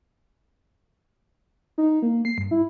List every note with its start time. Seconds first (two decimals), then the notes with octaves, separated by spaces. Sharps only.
1.78 D#4
2.02 A#3
2.25 C7
2.38 G2
2.51 E4